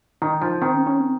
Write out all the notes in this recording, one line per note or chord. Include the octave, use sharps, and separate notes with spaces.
D#3 D#4
F3
D#3 C4
C#4
C#4
C4